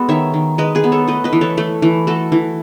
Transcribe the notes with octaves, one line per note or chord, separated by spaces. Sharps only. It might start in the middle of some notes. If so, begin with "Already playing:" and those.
Already playing: G#3 B3 F#4 A4
D#3 C#5 E5
D#3
G#3 B4 D#5
G#4 B4
B3
A4 C#5
A3 B4 D#5
B4 D#5
E3
A4 C#5
A3
E3
A3 F#4 A4
E3